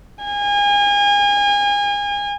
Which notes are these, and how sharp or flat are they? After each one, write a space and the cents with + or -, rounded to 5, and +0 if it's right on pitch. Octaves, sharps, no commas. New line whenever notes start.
G#5 -35